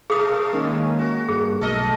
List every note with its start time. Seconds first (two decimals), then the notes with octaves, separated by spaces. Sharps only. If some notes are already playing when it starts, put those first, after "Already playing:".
0.10 B2 A3 G#4 A#4 F5 D#6
0.53 D#3 G#3 A#3 C#4
0.99 F#4
1.29 G2 G#4
1.61 B1 A3 A4 A#4 D#5